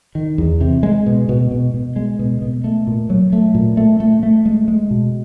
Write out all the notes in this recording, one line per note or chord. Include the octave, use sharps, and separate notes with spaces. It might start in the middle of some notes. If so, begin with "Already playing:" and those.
D#3
E2
C3
G#3
B2
B2
B2
B2
G#3
B2
B2
A3
A#2
F#3
A3
A#2
A3
A3
A3
G#3
G#3
B2